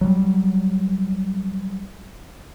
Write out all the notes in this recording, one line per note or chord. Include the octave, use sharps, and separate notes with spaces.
F#3 G3